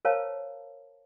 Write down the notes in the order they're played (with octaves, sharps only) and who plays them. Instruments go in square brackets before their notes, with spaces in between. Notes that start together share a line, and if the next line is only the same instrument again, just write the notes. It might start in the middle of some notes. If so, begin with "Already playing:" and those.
[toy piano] A#4 C5 C#5 F5 A5 A#5